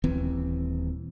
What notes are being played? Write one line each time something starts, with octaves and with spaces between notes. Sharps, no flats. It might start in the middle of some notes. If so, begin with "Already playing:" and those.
D#1 E3 C4